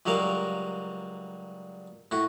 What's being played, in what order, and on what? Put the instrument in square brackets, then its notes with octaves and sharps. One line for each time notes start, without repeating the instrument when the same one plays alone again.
[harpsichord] C#2 F#3 G3 A#4 F5
A2 F#4